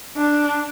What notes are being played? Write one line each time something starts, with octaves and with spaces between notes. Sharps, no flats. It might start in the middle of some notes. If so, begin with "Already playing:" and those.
D4